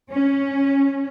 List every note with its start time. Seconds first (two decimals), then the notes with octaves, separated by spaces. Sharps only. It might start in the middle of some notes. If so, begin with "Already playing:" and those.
0.10 C#4